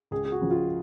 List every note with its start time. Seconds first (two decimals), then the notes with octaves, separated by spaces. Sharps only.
0.11 C#2 G#4
0.25 G#4
0.32 F#4
0.41 C#3 F3
0.51 F4